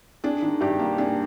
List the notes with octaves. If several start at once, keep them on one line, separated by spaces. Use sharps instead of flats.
D4 G#4
D#3
G2 G4
A#3
D4 G#4